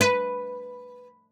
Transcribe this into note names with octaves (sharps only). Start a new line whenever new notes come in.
B4